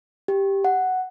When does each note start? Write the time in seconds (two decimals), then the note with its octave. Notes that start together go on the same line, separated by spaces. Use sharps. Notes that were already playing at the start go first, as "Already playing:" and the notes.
0.28 G4
0.65 F#5